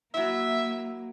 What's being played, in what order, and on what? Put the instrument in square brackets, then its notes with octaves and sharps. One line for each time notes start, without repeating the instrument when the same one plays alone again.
[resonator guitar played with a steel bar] F#3 E4 [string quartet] A#3 [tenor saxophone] E5